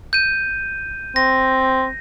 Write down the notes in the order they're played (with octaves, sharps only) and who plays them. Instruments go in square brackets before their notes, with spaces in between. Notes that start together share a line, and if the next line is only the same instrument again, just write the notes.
[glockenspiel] G6 D#7
[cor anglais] C4 [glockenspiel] A#6